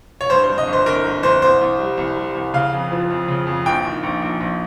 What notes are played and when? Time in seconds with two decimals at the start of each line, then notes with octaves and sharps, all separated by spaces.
0.21 C#5
0.30 G2 C5
0.44 C5
0.49 G2
0.58 D#5
0.67 G1
0.73 C5
0.86 G1 A#4
1.05 G1
1.23 G1 C5
1.42 C2 C5
1.61 C2
1.79 G3
1.98 C2
2.16 G3
2.35 C2
2.54 C#3 F5
2.73 F2
2.92 F3
3.10 F2
3.28 C#3
3.47 F2
3.66 A#1 G5
3.85 D#3
4.03 A#1
4.22 A#1
4.41 A#1